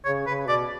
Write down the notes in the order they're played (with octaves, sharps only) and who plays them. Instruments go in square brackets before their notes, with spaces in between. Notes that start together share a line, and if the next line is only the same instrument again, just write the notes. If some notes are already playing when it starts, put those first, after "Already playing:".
[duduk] C#3 [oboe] C#5
[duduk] C#3 [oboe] B4
[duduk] B2 [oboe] D5